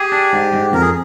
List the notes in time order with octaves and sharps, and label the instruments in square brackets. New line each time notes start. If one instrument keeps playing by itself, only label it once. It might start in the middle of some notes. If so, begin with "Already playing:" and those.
Already playing: [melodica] G4 [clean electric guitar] G#4
[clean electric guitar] D4
G#2
G#2
[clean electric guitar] F2 [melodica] A#4
[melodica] G#4